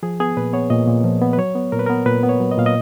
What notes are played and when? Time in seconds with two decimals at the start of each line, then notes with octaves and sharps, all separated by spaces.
0.03 F3 G#4
0.20 B3 G#4
0.37 A#2 B4
0.53 B3 C#5
0.70 A#2 D#5
0.88 A#2
1.04 F3
1.21 B3
1.33 B4
1.38 F#3 C#5
1.55 B3
1.72 A#2 A#4
1.79 B4
1.86 B3 A#4
2.06 A#2 B4
2.23 B3
2.29 C#5
2.40 F#3
2.51 D#5
2.57 A#2 F5
2.66 D#5